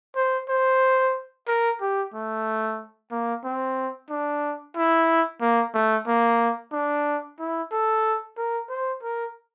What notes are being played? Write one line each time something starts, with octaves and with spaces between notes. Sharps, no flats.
C5
C5
A#4
G4
A3
A#3
C4
D4
E4
A#3
A3
A#3
D4
E4
A4
A#4
C5
A#4